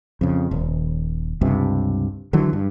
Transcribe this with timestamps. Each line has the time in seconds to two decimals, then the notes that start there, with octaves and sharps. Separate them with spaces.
0.21 F2 C#3
0.51 D#1
1.41 C#2 G2 C3
2.33 D3 E3 F#3
2.53 G2